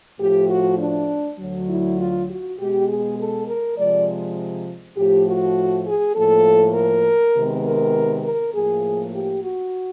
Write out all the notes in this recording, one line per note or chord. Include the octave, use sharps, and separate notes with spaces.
A2 F3 A3 G4
F#4
D4
D2 D3 F#3
E4
F4
F#4
B2 G#3 B3 G4
G#4
A4
A#4
C3 F3 G#3 D5
A2 F3 A3 G4
F#4
G#4
A2 F3 A#3 A4
A#4
C3 D#3 G#3 B3
A#4
A#4
A2 F3 A#3 G#4
G4
F#4